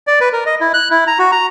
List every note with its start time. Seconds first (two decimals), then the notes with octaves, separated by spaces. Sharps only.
0.07 D5
0.21 B4
0.33 A#4
0.46 D#5
0.61 E4
0.74 F#6
0.91 E4
1.07 A#5
1.19 F#4
1.32 A#5